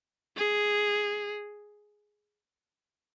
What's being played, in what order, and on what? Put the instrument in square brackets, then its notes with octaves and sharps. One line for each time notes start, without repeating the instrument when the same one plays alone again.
[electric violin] G#4